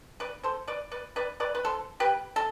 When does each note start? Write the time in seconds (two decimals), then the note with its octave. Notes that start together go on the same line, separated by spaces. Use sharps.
0.20 B4 D5
0.43 A4 C5
0.68 B4 D5
0.92 B4 D5
1.16 B4 D5
1.40 B4 D5
1.55 B4
1.65 A4 C5
2.00 G4 B4
2.36 A4